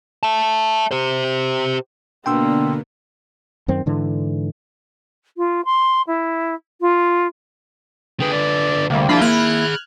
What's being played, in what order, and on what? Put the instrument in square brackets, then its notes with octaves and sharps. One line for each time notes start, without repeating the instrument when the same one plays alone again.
[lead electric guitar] E5 A5
G4 C5
[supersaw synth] B2 D3 B3 [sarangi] A#3 [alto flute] D4 [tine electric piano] G5 C6 E6
[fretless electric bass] F#2 D#3 C4
G#2 D3 E3
[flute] F4
C6
E4
F4
[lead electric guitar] D3 B4 [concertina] G#4 G5
[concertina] D5
[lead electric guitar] D2 [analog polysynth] C3 G3 [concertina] A#3
[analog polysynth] F3 A#3 F4 [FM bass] D4 [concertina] E4 [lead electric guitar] G#4 B5
[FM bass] A#3 [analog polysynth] F6 F#6 G#6